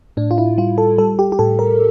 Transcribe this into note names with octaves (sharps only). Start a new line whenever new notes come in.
A2 D4
F4
E4
G3 F4
A4
G3 A4
G4
G4
A2 A4
A#4